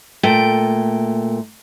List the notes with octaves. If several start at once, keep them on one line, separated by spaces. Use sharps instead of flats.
A#2 A3 G5